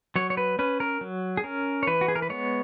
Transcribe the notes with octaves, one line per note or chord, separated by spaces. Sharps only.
F#3 C#5
C#5
B4
C#4 B4
A#4
F#3
G#4
C#4 A#4
C#5
E3 B4
F#4
G#4
A#4
B4
G#3 B3 C#5